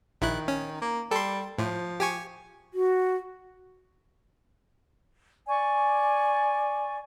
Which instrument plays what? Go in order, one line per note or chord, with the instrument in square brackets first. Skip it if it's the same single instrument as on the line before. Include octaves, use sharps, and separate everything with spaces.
[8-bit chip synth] A#1 E4 F#6 [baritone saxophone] D#3
[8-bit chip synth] C#4
[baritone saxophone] A#3
[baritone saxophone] G3 [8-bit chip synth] A4 C6
[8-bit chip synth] A2 [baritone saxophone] F3
[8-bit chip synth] G4 G#5 C#6
[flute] F#4
[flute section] D5 G#5 C#6